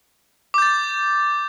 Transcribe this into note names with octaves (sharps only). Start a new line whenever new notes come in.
D6 G6 A6